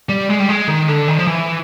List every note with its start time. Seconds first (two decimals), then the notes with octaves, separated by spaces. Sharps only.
0.09 G3
0.29 G#3
0.40 G3
0.49 G#3
0.68 D#3
0.88 D3
1.08 D#3
1.18 F3
1.27 E3